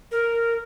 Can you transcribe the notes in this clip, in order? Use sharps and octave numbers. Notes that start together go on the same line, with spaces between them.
A#4